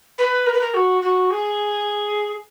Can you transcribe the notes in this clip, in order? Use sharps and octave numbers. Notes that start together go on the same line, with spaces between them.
B4
A#4
B4
A#4
F#4
F#4
G#4